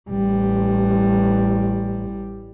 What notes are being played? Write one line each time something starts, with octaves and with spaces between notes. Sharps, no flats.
A1 G3